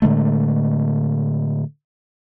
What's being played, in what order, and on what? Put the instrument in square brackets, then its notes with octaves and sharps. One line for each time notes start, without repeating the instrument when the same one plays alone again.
[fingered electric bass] A2 D3 G#3 A3